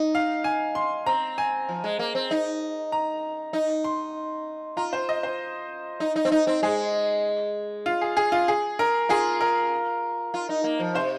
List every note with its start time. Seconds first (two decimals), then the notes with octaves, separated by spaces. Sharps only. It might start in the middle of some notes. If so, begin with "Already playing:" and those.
Already playing: D#4
0.15 F5
0.44 G#5
0.75 C6
1.06 C4 A#5
1.38 G#5
1.69 F3
1.84 G#3
1.99 A#3
2.15 C4
2.31 D#4
2.92 A#5
3.53 D#4
3.84 C6
4.77 F4 A#5
4.93 C5
5.09 D#5
5.23 C5
6.00 D#4
6.16 D#4
6.25 C4
6.32 D#4
6.47 C4
6.63 G#3 G#4
7.86 F4
8.01 G#4
8.17 G#4
8.32 F4
8.48 G#4
8.79 A#4
9.09 F4 G#4
9.41 A#4
10.34 F4
10.49 D#4
10.64 A#3
10.79 F3
10.94 C3 C5